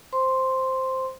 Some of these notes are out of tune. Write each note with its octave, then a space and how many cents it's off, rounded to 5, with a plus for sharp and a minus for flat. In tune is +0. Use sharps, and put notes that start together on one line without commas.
C5 +0 C6 +0